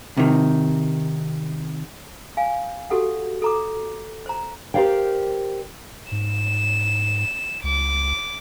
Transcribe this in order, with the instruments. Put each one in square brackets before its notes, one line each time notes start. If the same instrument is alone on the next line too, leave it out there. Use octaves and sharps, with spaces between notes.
[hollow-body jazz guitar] C3 D#3
[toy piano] F5 G#5
F#4 G4 A4 F#5
A4 A#5 D6
C5 A#5
[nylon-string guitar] G4 A#4 C5 D5 F5 G5
[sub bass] G#2 [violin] E7
[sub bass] C#2 [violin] D6